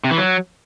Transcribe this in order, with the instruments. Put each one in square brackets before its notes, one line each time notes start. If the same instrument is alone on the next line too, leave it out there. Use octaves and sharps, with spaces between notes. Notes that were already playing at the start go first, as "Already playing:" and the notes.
[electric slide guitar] C3
E3
F#3